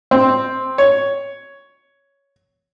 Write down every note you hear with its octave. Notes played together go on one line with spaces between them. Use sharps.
C4
C#5